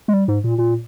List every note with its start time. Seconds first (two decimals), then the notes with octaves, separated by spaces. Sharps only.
0.08 G#3
0.14 G3
0.28 G#2
0.44 A#2
0.58 A#2